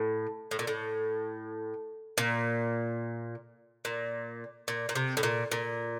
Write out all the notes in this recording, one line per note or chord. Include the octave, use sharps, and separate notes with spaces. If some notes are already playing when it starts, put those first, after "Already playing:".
Already playing: A2
A2
A#2
A2
A#2
A#2
A#2
A#2
C3
A2
A#2
A#2